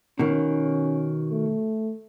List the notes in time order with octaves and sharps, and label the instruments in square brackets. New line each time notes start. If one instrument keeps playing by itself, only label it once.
[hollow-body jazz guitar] B2 D#3 [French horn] C#4
[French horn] A3